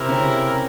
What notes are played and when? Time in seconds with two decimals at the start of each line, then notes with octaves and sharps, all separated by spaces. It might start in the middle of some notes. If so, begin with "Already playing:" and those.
Already playing: C3 C4 E4 G4 A#4
0.09 C#3 C#4